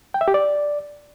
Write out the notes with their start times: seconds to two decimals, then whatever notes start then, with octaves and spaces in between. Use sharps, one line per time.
0.14 G5
0.21 E5
0.28 G4
0.34 D5